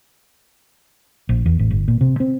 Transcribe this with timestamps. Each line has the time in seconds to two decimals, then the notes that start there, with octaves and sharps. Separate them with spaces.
1.29 A#1
1.46 E2
1.59 A1
1.71 G1
1.88 A#2
2.01 C3
2.20 C4